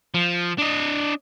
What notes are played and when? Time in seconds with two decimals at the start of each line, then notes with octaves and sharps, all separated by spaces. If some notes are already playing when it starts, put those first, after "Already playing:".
0.14 F3
0.58 D4 D#5